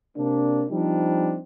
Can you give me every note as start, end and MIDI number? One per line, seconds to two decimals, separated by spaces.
0.17 0.64 48
0.17 0.64 58
0.17 0.64 62
0.70 1.38 53
0.70 1.38 55
0.70 1.38 60
0.70 1.38 62
0.70 1.38 63